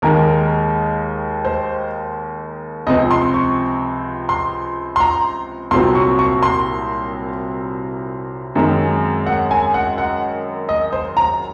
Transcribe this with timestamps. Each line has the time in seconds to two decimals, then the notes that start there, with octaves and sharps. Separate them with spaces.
0.02 D#2 D#3 G#3 A#4
1.45 C5
2.87 C#2 C3 F3 C4 D#5
3.11 C6
3.34 C#6
4.29 C6
4.96 C6
5.00 A#5
5.71 C2 A#2 F#3 C4 C6
5.95 C#6
6.19 C#6
6.43 C6
8.55 F#2 D#3 G#3 C4
9.27 F#5
9.51 G#5
9.74 F#5
9.98 F#5
10.69 D#5
10.93 C5
11.17 A#5